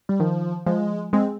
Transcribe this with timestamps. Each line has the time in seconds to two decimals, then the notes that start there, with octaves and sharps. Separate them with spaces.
0.09 G3
0.20 D#3 F3
0.66 F3 G#3
1.13 G#3 C4